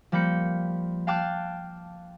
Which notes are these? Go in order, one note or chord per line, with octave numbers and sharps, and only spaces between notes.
F3 G3 A#3 B5 G6 C#7
F5 G5 A5 D6 F#6